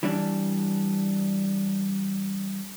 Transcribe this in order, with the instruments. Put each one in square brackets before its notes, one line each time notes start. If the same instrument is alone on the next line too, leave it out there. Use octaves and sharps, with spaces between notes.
[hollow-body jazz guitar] E3 G3 D4